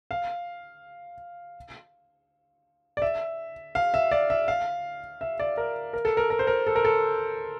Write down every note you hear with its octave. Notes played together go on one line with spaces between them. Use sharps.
F5
D5
E5
F5
E5
D5
E5
F5
E5
D5
A#4
A#4
A4
A#4
A#4
C5
A#4
A4
A#4
A4